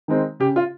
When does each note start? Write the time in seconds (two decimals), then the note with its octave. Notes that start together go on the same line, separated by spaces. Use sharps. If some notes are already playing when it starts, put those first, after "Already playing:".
0.08 D#3 G#3 C4 D#4
0.40 C#3 G4
0.56 F4